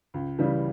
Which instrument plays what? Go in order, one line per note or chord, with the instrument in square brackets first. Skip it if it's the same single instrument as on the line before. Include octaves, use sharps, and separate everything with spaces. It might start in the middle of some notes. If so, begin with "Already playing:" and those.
[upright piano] C#2
C#3 E3 G3